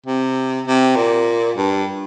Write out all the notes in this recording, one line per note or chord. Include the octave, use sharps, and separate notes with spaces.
C3
C3
A#2
G2